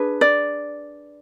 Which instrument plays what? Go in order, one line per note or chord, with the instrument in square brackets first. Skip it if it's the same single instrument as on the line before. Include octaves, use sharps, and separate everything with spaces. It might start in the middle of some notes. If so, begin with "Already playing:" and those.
Already playing: [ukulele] D4 G#4 B4
D5